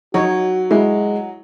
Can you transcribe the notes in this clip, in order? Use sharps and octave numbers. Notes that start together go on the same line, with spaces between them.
F#3 D#4 F#4 C#5 D#5
G#3 E4